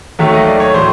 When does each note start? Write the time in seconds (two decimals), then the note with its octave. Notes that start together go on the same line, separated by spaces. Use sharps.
0.19 D#2 D#3 F#3 A3 E5
0.33 D#5
0.47 D5
0.60 C#5
0.74 A2 F#3 A3 C5